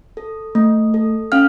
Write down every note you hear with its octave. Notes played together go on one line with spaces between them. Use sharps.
A4
A3
A4
C#4 F5 F6